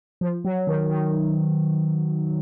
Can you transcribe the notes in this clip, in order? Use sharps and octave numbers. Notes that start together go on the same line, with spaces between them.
F3
F#3
D#3
D#3